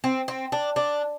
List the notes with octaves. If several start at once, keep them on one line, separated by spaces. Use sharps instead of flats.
C4
C4
D4
D4